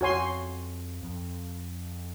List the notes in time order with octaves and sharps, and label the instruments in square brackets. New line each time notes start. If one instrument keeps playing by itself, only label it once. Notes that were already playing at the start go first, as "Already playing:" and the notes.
[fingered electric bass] F2 [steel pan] F#4 C#5 G#5 C6
[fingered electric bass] F2